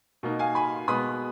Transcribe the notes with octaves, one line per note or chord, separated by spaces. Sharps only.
B2 A#3 D#4
F5 G#5
G#5 B5
B2 G#3 B3 B5 D#6